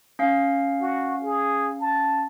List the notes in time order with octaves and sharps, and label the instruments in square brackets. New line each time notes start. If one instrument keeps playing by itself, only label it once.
[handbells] C#4 F5
[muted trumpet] F#4
G#4
A5